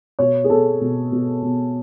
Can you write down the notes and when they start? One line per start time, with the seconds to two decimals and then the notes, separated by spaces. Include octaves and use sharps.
0.19 B2 C#5
0.44 G#4
0.50 B2 A4
0.81 B2
1.12 B2
1.42 B2